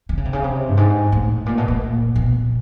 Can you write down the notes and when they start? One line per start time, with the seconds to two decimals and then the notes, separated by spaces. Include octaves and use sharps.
0.09 D3
0.17 C#3
0.25 C3
0.33 C#3
0.44 C3
0.69 G2
0.77 G#2
1.12 A2
1.46 A#2
1.58 B2
1.68 A#2
2.15 B2